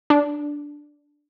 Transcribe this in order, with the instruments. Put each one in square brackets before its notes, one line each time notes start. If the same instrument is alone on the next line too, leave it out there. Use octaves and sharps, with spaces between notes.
[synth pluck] D4